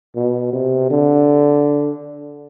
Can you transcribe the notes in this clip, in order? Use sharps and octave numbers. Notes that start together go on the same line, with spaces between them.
B2
C3
D3